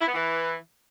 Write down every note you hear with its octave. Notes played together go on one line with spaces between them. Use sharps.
E4
B3
E3